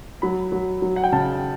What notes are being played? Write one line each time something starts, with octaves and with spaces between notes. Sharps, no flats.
F#3 B5
F#3
F#3
F#5
G5
C#3 A5